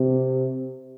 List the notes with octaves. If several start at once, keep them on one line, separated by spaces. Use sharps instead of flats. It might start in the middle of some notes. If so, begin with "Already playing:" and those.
Already playing: C3